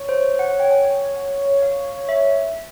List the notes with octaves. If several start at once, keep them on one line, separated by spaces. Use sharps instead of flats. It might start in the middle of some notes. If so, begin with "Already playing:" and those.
Already playing: C#5
C5
F#5
G5
G#5
F#5
F5
E5